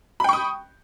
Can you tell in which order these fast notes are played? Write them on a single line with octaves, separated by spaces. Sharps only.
B5 G5 C#6 D#6